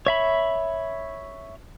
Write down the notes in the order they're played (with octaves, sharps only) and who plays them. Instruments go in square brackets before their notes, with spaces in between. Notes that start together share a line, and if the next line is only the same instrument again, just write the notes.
[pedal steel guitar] C#5 E5 B5